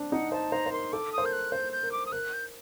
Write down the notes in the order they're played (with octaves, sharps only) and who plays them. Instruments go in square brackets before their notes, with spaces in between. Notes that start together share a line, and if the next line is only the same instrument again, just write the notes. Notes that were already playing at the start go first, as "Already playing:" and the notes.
Already playing: [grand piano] C4 D4
[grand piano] D#4 [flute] F#5
[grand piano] C5 [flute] A5
[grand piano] C5 [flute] A#5
[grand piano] C5
[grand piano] A#4 [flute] C6
[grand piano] A4 [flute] D6
[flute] D#6
[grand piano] C5
[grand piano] A#4 [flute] G6
[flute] F#6
[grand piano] C5 [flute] G6
[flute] G6
[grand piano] A#4
[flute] D6
D#6
[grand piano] A#4 [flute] F#6
[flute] G6